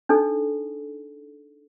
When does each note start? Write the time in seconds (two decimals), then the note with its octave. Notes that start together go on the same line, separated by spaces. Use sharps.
0.09 D4 D#4 A4